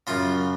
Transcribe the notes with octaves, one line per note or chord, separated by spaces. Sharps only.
F#2 C#3 F4